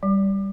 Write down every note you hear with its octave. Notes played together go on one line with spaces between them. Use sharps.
G3